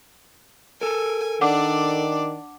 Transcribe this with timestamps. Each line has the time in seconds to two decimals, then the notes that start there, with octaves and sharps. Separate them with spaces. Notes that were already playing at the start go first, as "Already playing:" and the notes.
0.81 A4 A#4 G#5
1.41 D#3 D4 D5 F#5 D6